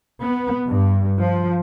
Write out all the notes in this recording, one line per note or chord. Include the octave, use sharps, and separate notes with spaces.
B3
G2
F3